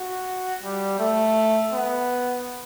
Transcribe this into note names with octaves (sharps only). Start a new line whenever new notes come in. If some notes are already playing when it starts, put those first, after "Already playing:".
Already playing: F#4
G3
A3
B3